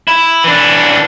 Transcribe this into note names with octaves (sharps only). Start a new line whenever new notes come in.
E4
E3 D4